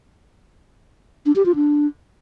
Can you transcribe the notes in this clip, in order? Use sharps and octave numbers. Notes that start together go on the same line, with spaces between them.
D4
G4
F4
D4